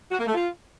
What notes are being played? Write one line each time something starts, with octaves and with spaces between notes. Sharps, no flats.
F#4
A#3
A3
F4